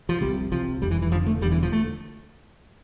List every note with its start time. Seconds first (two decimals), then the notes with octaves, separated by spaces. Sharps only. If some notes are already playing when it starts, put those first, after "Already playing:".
0.09 F3
0.20 C2 C3 G3
0.52 C2 C3 F3
0.81 F1 F2 D3 G3
0.91 E3
1.02 E3
1.11 F1 F2 D3 F3
1.26 A3
1.41 E1 E2 D3 G3
1.51 E3
1.62 F3
1.72 A3